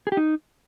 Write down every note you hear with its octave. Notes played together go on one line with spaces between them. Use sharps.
G#4
G4
D#4